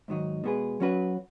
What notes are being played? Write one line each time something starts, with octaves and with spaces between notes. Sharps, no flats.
G#2 D#3 F#3 D#4
B2 G#3 B3 G#4 B4
F#3 C#4 F#4 B4